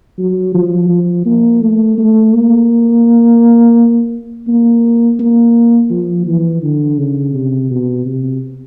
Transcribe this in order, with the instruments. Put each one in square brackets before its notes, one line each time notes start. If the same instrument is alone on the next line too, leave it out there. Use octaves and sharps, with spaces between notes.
[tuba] F#3
F3
F3
A#3
A3
A3
A#3
A#3
A#3
F3
E3
D3
C#3
C3
B2
C3